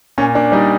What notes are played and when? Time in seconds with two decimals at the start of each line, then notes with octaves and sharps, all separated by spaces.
0.18 A#2 C#4
0.35 A#2 D4
0.52 G3 D#4